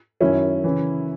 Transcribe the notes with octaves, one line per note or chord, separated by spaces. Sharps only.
F#2 D#3 F#3 C#4 E4
C#3 E3